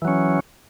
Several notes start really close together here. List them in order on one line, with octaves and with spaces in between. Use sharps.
E3 F#3 C#4